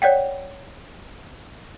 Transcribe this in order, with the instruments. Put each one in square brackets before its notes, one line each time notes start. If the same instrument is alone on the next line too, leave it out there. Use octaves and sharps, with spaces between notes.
[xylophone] C#5 D5 F#5 G5